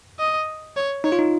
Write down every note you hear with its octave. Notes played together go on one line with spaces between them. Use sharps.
D#5
C#5
D#4 C#5
F4
D#4